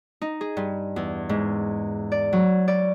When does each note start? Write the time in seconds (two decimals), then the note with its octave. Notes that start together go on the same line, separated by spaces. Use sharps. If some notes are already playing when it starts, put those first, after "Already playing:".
0.22 D#4
0.41 G#4
0.57 G2
0.96 E2
1.29 G#2
2.12 D5
2.33 F#3
2.68 D5